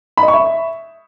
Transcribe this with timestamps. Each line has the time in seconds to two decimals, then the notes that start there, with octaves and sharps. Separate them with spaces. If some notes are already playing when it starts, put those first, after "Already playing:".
0.17 B5
0.23 D#5
0.28 C#6
0.34 E5